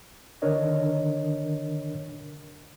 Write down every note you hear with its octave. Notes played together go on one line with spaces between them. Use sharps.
D3 D#3 D4 A#4 C#5 D#5